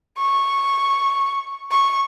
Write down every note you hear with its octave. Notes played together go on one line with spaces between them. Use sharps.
C#6
C#6